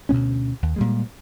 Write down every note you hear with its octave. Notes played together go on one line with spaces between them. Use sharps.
D2 B2 B3 C#4
D#2
A#2 G3 G#3